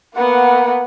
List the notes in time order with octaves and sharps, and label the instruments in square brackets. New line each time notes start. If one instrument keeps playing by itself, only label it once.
[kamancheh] A#3 B3 [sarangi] F#5